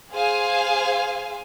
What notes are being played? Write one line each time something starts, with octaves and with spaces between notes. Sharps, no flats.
G#4 C5 F5 G#5